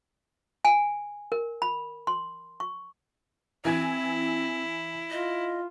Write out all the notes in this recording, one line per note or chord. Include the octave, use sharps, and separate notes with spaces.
G#5
A#4
B5
C6
C#6
E3 C4 E4 G#5 G#6
F4 D#5